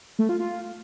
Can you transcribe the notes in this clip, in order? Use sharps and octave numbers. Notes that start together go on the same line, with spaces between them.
A3
F4
F4